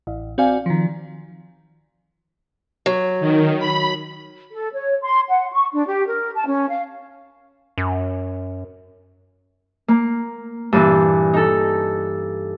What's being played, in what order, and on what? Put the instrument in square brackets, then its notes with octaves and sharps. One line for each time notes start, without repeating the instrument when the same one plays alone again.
[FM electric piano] A1
C4 F#4 D5 F5 G#5
D#3 F3
[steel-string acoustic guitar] F#3
[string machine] D#3
B5
[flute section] A4
C#5
C6
F#5
C#6
D4
G4
A#4
A5
C#4
F5
[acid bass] F#2
[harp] A#3
G2 A#2 E3
D#4 A4